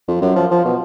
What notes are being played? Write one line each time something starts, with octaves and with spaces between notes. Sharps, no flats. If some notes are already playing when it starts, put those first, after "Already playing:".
F2
F#2
F3
F3
B2